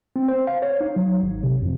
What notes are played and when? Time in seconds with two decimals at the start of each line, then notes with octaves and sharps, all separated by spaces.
0.16 C4
0.28 C5
0.47 F5
0.62 C#5
0.81 D#4
0.96 F#3
1.23 G#1
1.43 C3
1.62 F2